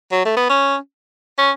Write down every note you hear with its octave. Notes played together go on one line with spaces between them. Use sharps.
F#3
A3
B3
C#4
C#4